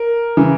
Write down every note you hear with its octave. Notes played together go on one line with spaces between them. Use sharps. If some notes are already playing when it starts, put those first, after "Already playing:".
Already playing: A#4
C#3 E3